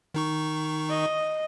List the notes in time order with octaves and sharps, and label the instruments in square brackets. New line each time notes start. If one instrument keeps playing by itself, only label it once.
[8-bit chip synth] D#3 D#4 C#6
[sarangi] D#5